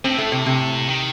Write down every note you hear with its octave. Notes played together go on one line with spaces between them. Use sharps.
A2 C4
A3
C3
C3
D#3